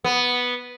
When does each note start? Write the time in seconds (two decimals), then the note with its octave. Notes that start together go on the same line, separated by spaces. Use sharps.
0.04 B3